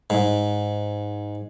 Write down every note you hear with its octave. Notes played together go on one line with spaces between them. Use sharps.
G#2